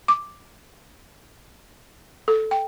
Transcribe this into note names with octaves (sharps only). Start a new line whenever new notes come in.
D6
A4
G5